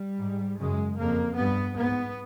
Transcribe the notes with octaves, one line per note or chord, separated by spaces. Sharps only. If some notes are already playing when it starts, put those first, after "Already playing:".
Already playing: G3
G#2
F#2 C#3 G#3
F2 C#3 A#3
G2 B3
G#2 B3